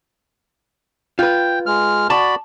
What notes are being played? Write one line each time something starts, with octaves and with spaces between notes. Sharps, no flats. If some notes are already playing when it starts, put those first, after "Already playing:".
F4 B4 G5
G#3 F6
F#4 D5 A5 B5